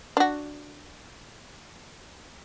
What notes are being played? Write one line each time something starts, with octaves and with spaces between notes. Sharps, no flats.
D4 F#4